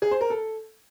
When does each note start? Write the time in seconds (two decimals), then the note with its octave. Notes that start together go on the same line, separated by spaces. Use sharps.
0.02 G#4
0.11 C5
0.21 A#4
0.30 A4